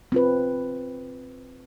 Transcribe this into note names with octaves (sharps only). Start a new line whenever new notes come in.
C4 F4 B4